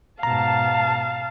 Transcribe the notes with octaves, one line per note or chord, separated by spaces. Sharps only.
G#2 B2 F5 A5 A#5